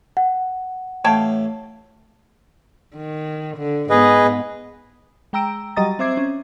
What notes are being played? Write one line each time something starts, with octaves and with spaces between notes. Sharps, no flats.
F#5
A1 A3 C#5 F5 G5 A5
D#3
D3
G#2 B3 G#4 B4 D#5
G#3 G5 A#5 E6 D7
F#3 G3 D#5 A#5 D#6 A6
C4 C5 E5 D6 G#6 C7
C#4